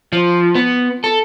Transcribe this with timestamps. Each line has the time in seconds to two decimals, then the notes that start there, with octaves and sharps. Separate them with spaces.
0.13 F3
0.55 B3
1.04 A4